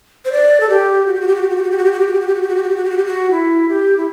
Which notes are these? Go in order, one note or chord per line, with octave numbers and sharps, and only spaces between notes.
C5
D5
A4
G4
F#4
G4
F#4
G4
F#4
G4
F#4
G4
F#4
G4
F#4
G4
F#4
G4
F#4
G4
F#4
G4
F#4
G4
F#4
G4
F#4
G4
F#4
G4
F#4
G4
F#4
E4
G4
E4